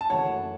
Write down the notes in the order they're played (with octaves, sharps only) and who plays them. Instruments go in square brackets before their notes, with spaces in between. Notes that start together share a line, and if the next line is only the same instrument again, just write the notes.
[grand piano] A5
[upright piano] F#1 F#2 E3 A3 [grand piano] C#5 F#5